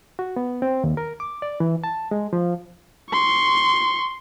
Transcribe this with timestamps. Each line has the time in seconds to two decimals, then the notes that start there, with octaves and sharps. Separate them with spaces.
0.19 F#4
0.36 B3
0.62 C4
0.84 D#2
0.97 A#4
1.20 D6
1.42 D5
1.60 E3
1.84 A5
2.11 G#3
2.33 F3
3.11 C6 C#6